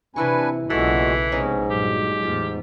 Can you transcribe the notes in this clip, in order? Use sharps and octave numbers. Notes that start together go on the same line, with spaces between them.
C3 E3 D4 E4 B4 G#5 C#6
B1 A#2 C#3 E3 G#3 F#4 A4
A#1 G#2 C3 G#3 B3 C#4 D#4
G2 A#2 F#3 G4
E2 A2 F4